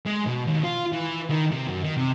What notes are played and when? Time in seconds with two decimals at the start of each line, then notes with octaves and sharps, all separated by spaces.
0.07 G#3
0.27 B2
0.47 D#2
0.64 F4
0.92 E3
1.30 D#3
1.52 C3
1.67 F#2
1.84 D#3
1.97 C3